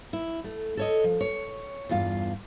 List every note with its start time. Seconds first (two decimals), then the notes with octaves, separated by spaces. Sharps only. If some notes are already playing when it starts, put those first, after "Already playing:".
0.13 E4
0.44 A3
0.77 A4 C#5 D#5
1.04 F3
1.21 C#5
1.89 E2 G2 F4 F5